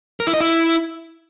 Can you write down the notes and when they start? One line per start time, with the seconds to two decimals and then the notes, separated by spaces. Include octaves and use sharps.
0.20 A#4
0.27 E4
0.34 D#5
0.40 E4